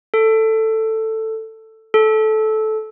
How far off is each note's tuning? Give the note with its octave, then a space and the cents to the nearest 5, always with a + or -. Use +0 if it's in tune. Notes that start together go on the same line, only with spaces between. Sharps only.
A4 +10
A4 -15